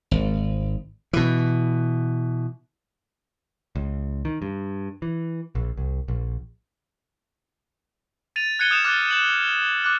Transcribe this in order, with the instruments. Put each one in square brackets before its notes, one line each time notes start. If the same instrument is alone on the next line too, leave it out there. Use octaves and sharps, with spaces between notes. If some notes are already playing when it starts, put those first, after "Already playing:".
[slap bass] G#1
B2 E3
[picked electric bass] C#2
D#3
G2
E3
A#1
C2
A#1
[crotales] A6 D#7 F7
F#6 G#6 C#7 D#7 G7
D#6 F6 G6 E7 F7
D6 F6 F#6 A6
G6 D#7 E7 F#7
D6 F#6